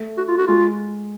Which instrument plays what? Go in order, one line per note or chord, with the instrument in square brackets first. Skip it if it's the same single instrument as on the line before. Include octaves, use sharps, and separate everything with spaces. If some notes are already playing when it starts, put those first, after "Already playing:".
Already playing: [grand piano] A3
[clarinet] F#4
F4
F#4
[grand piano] G#3 [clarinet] F4